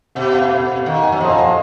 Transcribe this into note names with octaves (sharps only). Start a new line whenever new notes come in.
B2 F#5
F5
F#5
F5
D#3 F#5
G#5
F#3
F3 D#5 F#5
F5
D#5